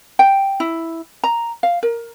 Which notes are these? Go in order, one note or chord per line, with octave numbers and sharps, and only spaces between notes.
G5
E4
A#5
F5
A#4